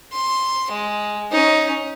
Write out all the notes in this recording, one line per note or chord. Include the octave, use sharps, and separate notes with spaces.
C6
G#3
C#4 D#4